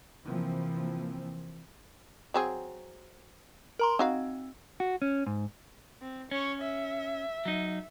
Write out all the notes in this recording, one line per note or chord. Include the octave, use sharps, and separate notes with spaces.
C3 E3 F3 A#3 C4
F#3 C4 G#4
A#4 A#5 C6
C4 D#4 F#4 F5
F#4
C#4
G#2
C4
C#4 C#5
E5
F#3 D#4